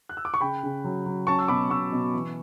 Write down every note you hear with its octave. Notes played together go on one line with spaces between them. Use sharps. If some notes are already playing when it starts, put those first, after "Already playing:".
F#6
E6
D6
C#6
C#3 G5 B5
C#3
F#3
F#3
C#4 A5 C#6
E6
B2 B5 D6
B2 C#6 E6
B2
E3